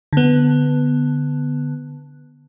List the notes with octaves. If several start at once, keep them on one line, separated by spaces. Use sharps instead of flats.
D3 B3